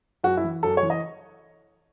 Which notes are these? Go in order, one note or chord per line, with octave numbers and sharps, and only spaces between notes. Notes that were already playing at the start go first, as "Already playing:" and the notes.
F#2 F#4
E4
E3
F#2 A4
C#5
E3
D#5